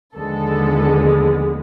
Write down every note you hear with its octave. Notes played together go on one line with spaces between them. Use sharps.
D#2 D3 F3 G#3 B3 A4